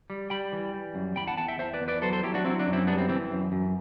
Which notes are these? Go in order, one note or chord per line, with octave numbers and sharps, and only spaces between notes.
G3
G3 G5 B5
E3
G3
F#2
E2 G5 B5
F#5 A5
E2 F#5 A5
E5 G5
E2 C5 E5
B4 D5
E2
B4 D5
F#3 A4 C5
A4 C5
F#3 E4 G4
D4 F#4
F#3 C4 E4
D4 F#4
F#2
C4 E4
G3 B3 D4
C4
E3 C4
F#2
F#2